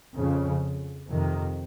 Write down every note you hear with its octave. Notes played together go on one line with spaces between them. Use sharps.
F2 C#3 F3
F2 C3 D#3